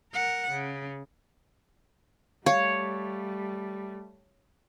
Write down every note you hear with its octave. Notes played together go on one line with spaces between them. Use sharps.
A#4 F#5
C#3
G3 A3 C#5 F5